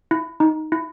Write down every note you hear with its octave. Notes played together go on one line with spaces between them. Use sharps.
E4
D#4
E4